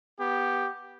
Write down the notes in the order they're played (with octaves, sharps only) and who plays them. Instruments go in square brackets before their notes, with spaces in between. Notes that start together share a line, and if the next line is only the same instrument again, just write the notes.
[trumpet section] B3 G4